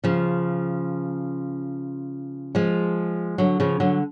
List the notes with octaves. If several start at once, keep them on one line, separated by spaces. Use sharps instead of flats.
C#3 F3
F3 G#3
D3 F#3
C#3 F3
D3 F#3